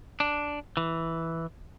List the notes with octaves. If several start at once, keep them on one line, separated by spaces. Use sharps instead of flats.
D4
E3